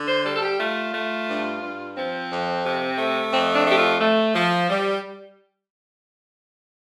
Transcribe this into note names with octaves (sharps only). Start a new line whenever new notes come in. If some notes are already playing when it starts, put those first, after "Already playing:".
Already playing: D3
C5
G3 A4
A4
G4
A3 F4
A3
G2
G2
F3 C4
F2
C3
A3
F2 C4
D4
A3 G4
F4
A3
F3
G3